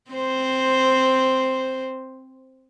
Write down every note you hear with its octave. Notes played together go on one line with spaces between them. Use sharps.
C4 C5